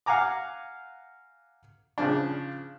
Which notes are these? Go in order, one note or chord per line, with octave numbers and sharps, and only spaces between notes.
F5 F#5 G#5 A#5 D6
C#3 F3 D4